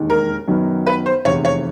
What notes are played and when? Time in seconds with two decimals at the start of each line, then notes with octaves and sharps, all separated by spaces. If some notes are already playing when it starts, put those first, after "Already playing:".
Already playing: E1 D#2 D#3 G#3
0.10 A#4
0.48 F#2 D#3 F#3 B3
0.86 B4
1.06 C5
1.25 F1 E2 C3 C#5
1.45 C#5